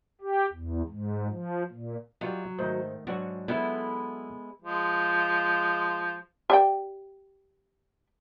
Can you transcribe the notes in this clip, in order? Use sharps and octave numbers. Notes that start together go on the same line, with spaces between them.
G4
E2
G#2
F3
A#2
F#3 G3 F4 D#5
G#2 D#3 A3 C5
G#2 F#3 D4 F#4
G#3 B3 E4 A4
F3 G#3
G4 D5 G5